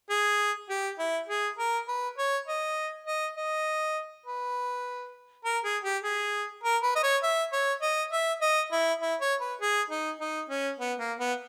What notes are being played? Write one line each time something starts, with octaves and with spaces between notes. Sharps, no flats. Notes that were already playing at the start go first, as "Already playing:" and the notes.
G#4
G4
E4
G#4
A#4
B4
C#5
D#5
D#5
D#5
B4
A#4
G#4
G4
G#4
A#4
B4
D#5
C#5
E5
C#5
D#5
E5
D#5
E4
E4
C#5
B4
G#4
D#4
D#4
C#4
B3
A#3
B3